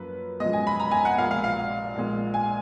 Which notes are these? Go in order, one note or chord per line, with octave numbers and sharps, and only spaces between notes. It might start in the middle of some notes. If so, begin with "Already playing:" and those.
Already playing: F#2 F3 A#3 B4
F#2 F3 G#3 D#5
G#5
B5
A#5
G#5
F#5
A#1 A#2 G#3 F5
F5
F5
A#1 A#2 G#3
G#5